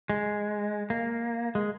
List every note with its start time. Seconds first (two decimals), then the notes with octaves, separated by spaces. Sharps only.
0.09 G#3
0.90 A#3
1.55 G#3